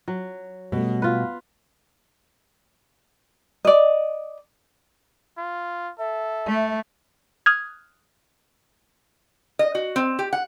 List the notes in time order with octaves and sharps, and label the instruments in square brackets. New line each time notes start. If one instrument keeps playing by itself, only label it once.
[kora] F#3
[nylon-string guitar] B2 [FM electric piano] G3 A3
[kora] F4 B4
[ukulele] D5 D#5
[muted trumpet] F4
[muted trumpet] A4 [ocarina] E5
[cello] A3
[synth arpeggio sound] D#6 F6 F#6 G#6
[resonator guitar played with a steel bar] D#5
F#4
C4
G4
F#5